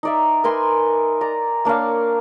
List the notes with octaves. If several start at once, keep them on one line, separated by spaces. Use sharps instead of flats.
D#4 D5 E5
A#4 B4 G#5 C6
D5 A#5
A#3 D4 C#5 F5